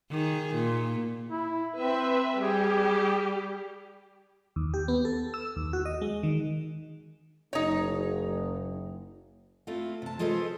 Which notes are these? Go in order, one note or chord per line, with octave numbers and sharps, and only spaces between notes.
D#3 G#4
A#2
E4
C4 B4 E5
G3 G4 G#4
D#2
G4
B3
A4
E6
D#2
F#4
D#5
G#3
D#3
F#1 D#4 C#5
A3 C4 E4 F4
C3 A5
G#3 F4 A4 B4 C5 D#5